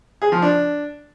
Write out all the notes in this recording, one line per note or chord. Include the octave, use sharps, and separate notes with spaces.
G#4
F3
D4